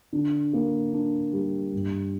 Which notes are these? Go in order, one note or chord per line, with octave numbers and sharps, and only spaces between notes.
D3
A#3
D4
G3
G2